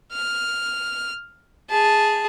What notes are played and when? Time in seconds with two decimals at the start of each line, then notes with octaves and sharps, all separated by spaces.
0.12 F6
1.70 G#4 A5